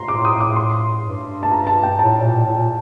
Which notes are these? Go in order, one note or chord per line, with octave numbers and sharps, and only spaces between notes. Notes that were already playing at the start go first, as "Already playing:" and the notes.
Already playing: A#5 C6
A2 D6
D#6
D6
C6
G2
A5
A#5
A5
G5
A2 A5
A#2
A2
A#2